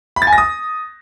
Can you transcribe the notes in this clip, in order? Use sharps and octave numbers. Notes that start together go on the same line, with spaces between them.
B5
A6
G#5
A#6
D#6